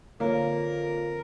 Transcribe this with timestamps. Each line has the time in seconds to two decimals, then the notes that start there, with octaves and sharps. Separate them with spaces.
0.20 F2 D3 A#3 A#4 C#5